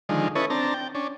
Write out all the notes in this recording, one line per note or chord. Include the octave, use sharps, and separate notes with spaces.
D3 D#3 F3 G#3
C#4 E4 A4 B4 C#5 D#5
C4 D4 A5 A#5
G5
C#4 D4